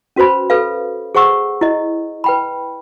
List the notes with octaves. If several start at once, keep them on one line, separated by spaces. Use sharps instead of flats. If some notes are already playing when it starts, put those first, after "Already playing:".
C#4 F#4 B4 C5 B5
A4 B4 F5
G#4 C5 F#5 C#6 E6
E4 D#5
B4 G5 B5